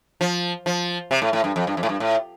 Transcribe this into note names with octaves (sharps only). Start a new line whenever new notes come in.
F3
F3
C3
A2
A2
G2
F2
G2
F2
A2
G2
A2